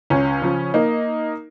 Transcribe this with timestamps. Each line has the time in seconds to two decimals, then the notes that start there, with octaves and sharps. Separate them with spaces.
0.10 C#2 C#4
0.42 C#3 F3
0.74 A#3 D#4